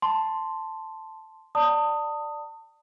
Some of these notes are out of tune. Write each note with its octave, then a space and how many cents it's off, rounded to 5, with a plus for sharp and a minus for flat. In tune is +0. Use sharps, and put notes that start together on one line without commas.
A5 +0 C6 +0
D5 +5 A5 +35 D#6 +0